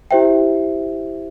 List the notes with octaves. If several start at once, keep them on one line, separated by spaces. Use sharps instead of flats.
E4 G4 C5 E5 G5